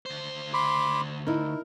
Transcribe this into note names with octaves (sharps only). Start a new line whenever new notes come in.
D2 C5
B5 C6 D6
D#4 E4 A#4